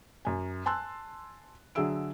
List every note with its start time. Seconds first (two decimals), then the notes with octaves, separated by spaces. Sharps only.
0.25 F#2 G#5
0.66 G#5 A5 C6 E6 F#6
1.75 D3 F#3 G#4 E5 E6 D7